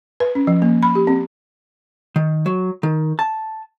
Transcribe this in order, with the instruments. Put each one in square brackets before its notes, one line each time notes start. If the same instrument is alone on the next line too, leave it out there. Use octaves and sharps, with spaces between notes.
[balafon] B4
C#4
F3
A#3
B5
G4
C4
[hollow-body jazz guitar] D#3
F#3
D#3
A5